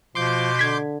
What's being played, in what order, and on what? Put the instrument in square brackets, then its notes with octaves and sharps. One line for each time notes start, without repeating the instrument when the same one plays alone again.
[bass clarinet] B2 [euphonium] F3 [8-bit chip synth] C6 D6 G6
[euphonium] D3 [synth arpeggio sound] G#6 B6